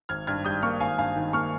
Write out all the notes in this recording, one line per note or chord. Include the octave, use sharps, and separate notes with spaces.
G#1 F6 G#6
G2 F6 G#6
G3 D#6 G6
A#3 C#6 F6
G#1 F5 G#5
G2 F5 G#5
D#3
A#3 C#6 F6